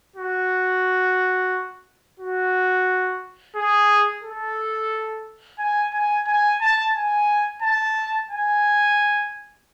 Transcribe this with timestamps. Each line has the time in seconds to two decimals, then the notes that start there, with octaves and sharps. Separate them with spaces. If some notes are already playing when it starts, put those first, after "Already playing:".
0.16 F#4
2.20 F#4
3.56 G#4
4.23 A4
5.59 G#5
5.93 G#5
6.27 G#5
6.61 A5
6.95 G#5
7.63 A5
8.31 G#5